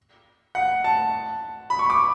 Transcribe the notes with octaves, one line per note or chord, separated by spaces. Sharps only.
F#5
A5
B5
C#6
D6